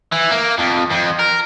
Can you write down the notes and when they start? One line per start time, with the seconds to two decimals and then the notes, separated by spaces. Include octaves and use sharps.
0.12 E3
0.31 A#3
0.58 F2
0.90 F2
1.19 A#4